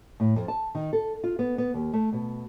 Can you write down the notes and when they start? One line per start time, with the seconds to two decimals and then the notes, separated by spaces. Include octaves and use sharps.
0.20 A2
0.36 F2
0.48 A5
0.75 D#3
0.93 A4
1.24 F4
1.39 B3
1.58 B3
1.74 D#2
1.93 A3
2.13 B2